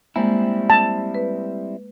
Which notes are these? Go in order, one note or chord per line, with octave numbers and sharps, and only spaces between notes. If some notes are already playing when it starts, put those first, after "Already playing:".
G3 G#3 A#3 C4 E4
A5
B4